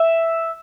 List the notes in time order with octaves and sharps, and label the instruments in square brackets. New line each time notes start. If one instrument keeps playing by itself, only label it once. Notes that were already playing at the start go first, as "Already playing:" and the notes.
Already playing: [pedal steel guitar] E5